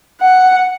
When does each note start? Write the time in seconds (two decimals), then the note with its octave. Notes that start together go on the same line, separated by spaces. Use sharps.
0.21 F#5